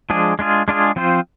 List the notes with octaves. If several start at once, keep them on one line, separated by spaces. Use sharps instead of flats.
F3 G#3 D4 G#4
G#3 D4 F4 G#4
G#3 D4 F4 G#4
F3 C4 F4 C5